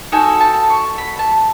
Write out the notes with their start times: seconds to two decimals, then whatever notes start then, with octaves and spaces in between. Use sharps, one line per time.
0.12 D#4 F#4 A4 G#5
0.40 A5
0.70 C#6
0.98 B5
1.19 A5